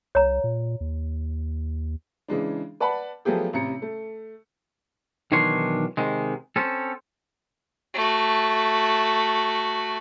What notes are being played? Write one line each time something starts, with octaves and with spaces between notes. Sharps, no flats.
C2 C#5 A#5
A#2
D#2
C#3 E3 G#3 D4
B4 D5 F#5 A5 B5
F3 F#3 A3 B3 G4 G#4
A1 C3 A#5 C#7
A3
B1 D#3 E3 D4 C#5 C6
C3 D#3 G#3
C4 C#4 A4
A3 F#4